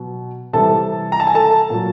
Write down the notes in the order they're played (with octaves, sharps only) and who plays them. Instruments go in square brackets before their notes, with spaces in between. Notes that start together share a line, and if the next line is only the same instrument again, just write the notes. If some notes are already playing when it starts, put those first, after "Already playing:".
Already playing: [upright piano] B2 F#3
C3 E3 G3 A4 A5
A#5
A5
G#5
A4 A5
A#2 F#3